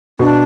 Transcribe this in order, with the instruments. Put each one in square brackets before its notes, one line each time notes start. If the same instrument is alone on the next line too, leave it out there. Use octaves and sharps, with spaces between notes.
[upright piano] B2 [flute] D4